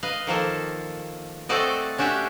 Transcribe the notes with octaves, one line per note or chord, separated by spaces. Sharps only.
B4 D#5 F5
D#3 F3 A#3 A4
A3 C4 F#4 A4 D5 D#5
C#4 D4 F#4 G4 E5